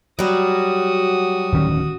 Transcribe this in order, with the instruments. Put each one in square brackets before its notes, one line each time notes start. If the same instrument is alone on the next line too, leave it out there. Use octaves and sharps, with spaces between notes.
[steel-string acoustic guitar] F#3 G3 [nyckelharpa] F#4 D#6
[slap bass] D1 D#3 C#4